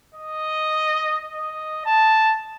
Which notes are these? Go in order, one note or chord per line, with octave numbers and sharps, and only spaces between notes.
D#5
D#5
A5